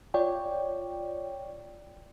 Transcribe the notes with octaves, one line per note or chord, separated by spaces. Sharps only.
F4 C#5 D5 G5